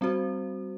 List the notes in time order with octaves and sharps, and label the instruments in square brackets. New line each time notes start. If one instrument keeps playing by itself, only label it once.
[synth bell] G3 C4 F#4 C5